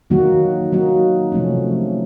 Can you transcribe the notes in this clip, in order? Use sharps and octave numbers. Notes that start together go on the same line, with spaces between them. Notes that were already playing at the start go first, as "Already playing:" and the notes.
D#3 F#3 A#3 D#4 F#4
D#3 F#3 A#3 D#4 F#4
C3 F3 A3 C#4